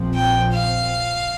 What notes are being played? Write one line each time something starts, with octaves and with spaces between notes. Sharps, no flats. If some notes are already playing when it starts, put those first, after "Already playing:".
Already playing: A#1 A#2 F3 C4
G5
F5